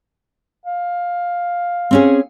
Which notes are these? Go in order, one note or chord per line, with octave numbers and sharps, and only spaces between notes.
F5
C4 C#4 G#4